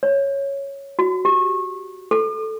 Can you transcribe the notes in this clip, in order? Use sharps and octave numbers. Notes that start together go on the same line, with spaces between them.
C#5
F#4
G4
A4